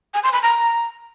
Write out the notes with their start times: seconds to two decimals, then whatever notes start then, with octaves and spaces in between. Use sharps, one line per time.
0.14 G#5
0.24 C6
0.33 B5
0.43 A#5